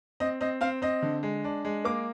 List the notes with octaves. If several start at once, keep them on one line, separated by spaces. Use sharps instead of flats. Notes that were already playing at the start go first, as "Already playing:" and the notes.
C4 D#5
C4 D#5
C4 F5
C4 D#5
D3
G#3
D4
G#3
A#3 D6